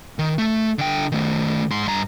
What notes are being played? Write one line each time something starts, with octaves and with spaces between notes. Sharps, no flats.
D#3
A3
D3 G5
D#3 A3
G#2 C6
G2 A#5